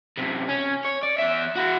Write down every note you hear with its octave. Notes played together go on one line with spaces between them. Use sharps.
F#2 C3
C#4
C#5
D5
E2 E5
E4 F#4